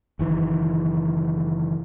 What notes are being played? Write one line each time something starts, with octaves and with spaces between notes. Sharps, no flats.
F#1 D#3 E3